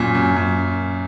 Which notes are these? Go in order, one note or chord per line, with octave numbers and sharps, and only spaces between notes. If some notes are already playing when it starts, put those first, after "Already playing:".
Already playing: F#2 A#2
F#2
F#2